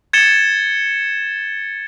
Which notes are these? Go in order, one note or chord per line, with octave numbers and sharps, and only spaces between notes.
G#6 A6 C#7 E7 G7